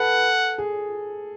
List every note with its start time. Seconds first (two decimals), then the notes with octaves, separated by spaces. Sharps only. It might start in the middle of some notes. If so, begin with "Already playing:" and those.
Already playing: A4 B4 F#5
0.58 G#4